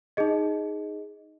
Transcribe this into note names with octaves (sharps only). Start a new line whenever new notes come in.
D#4 G#4 D#5